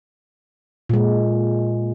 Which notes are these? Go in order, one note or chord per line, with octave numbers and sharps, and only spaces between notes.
A#2 G#3